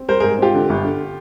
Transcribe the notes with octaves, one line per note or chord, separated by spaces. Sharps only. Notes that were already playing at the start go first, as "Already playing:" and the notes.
Already playing: C4
G3 A#4 C5
G#2 G#4 A#4
C4 F4 G4
D3
G1
D3